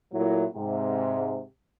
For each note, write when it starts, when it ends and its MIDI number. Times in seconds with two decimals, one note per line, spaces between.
0.13 0.46 46
0.13 0.46 54
0.13 0.46 57
0.13 0.46 64
0.54 1.43 44
0.54 1.43 48